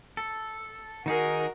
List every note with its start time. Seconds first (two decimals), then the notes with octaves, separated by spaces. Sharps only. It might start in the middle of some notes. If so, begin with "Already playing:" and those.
0.17 A4
1.06 D#3 D#4 F#4 G#4 A#4